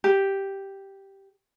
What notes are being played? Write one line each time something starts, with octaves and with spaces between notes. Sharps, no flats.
G4